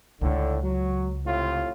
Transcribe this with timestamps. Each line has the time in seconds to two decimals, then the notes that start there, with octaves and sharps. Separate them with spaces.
0.21 C#2 A2 D3
0.63 F#3
1.26 A2 C3 F4